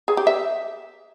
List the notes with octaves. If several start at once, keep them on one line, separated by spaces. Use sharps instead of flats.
G#4
G4
E5